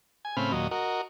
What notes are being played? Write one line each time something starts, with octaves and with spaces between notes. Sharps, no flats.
G#5
A2 C#3 C4 B5 F6
D#2 A#2 F#3 D#5
F#4 A#4 D#5